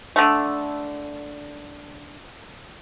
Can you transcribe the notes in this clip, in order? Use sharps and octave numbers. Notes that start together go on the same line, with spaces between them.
D3 A3